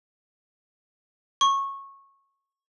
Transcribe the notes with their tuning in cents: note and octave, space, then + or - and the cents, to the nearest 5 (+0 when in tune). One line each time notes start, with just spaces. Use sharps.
C#6 -15